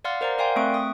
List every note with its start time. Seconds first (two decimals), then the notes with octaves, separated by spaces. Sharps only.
0.04 D5 F5 F#5 C6 F6 A6
0.21 A#4 C5 D5 F#5 A#5
0.38 A#4 D5 F5 G5 G#5 C6
0.56 A3 C4 E5 C#6 D7
0.74 D#6